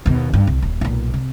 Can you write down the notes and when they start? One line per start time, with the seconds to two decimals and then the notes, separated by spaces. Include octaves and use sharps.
0.06 D#2 B2
0.33 G2
0.47 C2
0.62 D#1
0.81 B1 A#2
1.14 C3